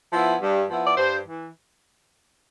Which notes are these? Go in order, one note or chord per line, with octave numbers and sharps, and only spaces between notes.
F3 B3 E4
G2
F3 B3 E4
D5
G2 C5
E3